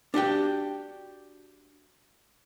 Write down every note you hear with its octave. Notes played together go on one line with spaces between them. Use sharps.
D4 F#4 G4 G5